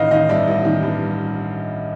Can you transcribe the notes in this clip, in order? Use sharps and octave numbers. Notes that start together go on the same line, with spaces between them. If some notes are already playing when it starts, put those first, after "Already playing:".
Already playing: A1 D#3 D#5 F5
D#3 D#5 F5
G2 D5 E5
A1
D#3
G2